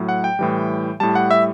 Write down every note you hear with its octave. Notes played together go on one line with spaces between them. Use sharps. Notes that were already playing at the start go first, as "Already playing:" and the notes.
Already playing: A2 F#3
F#5
G5
A2 E3 G3
A2 G3 A5
F#5
E5